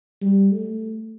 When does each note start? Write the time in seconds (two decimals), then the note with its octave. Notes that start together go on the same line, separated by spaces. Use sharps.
0.22 G3
0.52 A3